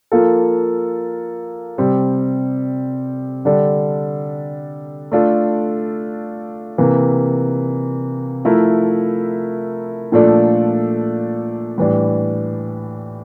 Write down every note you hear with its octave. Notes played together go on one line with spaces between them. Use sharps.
F3 A#3 F4 A4
C3 G3 C4
D3 G3 D4 A4
A3 D4 F4 A4
C3 E3 A#3
F3 A3 E4 A#4
A#2 F3 A3 D4 A4
A2 E3 G3 D4